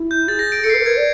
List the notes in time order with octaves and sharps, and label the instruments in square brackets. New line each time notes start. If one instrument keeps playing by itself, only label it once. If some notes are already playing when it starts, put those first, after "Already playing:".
Already playing: [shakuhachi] E4
[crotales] G6
[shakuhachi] G#4 [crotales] A6
[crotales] A#6
D7
[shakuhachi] A4 [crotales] C#7
[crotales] C7
[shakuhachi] B4 [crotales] C#7
[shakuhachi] A#4
[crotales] G#6
[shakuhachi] D5